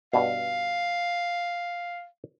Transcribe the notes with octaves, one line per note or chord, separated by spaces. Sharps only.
G2 B2 F5